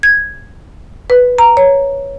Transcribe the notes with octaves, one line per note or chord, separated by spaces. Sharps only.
G#6
B4
A#5
C#5